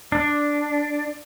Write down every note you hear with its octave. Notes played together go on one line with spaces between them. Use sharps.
D4